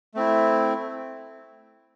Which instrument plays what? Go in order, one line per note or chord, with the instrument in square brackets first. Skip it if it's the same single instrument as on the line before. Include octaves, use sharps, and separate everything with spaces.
[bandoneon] A3 C4 E4